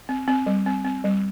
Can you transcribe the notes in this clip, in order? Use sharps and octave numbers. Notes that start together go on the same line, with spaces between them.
C4
C4
G3
C4
C4
G3